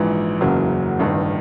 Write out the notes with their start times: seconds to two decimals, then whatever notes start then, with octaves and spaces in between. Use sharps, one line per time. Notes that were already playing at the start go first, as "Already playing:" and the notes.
Already playing: A#1 G#2 E3
0.41 F#1 E2 C#3 F#3 A#3
0.99 A1 G2 D#3